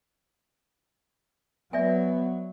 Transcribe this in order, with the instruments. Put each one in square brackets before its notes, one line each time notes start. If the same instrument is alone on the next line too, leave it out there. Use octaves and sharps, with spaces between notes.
[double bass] F#3 [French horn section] B3 [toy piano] D5 E5 G#5